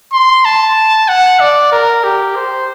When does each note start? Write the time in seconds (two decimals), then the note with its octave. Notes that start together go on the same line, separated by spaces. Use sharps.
0.13 C6
0.45 A5
1.08 F#5
1.40 D5
1.72 A#4
2.04 G4
2.36 C5